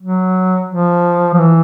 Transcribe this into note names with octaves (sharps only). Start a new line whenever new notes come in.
F#3
F3
F3
E3